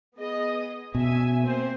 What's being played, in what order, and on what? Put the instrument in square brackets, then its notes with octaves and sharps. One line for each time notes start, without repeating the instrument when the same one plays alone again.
[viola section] B3 G#4 D#5
[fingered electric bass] B2 [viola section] C#4 E5 G#5
[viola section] A#3 C4 C5